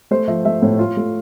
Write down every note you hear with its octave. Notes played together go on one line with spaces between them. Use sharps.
A3 C5
F3 E5
A3 E5
A2
F4
A3